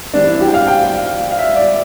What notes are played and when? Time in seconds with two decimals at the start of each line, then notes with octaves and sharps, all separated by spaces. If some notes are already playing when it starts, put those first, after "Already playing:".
0.14 E3 G3 C4 D4
0.27 E4
0.41 G4
0.48 G5
0.54 F5
0.67 G5
0.94 F5
1.31 F5
1.39 E5
1.56 D5